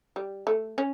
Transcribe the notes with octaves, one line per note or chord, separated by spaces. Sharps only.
G3
A3
C#4